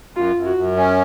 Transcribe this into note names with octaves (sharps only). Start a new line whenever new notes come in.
F#2 F4
F#2
F#4
F#2
C#4